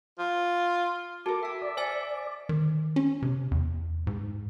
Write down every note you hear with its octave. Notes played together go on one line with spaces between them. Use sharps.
F4
F#4 A4 A#4 D6
E5 G5 A5
D5
C5 G#5 A6
D#3
C#4
C3
E2
G#2